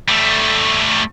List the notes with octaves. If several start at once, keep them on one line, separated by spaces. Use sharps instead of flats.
G3 A3